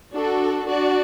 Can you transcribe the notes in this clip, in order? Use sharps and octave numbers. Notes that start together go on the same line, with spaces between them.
D4 F#4 A4
D4 F#4 D5